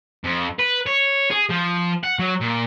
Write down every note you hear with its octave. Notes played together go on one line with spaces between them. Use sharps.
F2
B4
C#5
G#4
F3
F#5
F#3
A#2